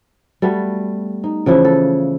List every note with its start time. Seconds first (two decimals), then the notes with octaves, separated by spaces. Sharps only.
0.42 G3 A3 B3 F#4
1.24 D#4
1.46 C#3 E3 F3 E4
1.65 A4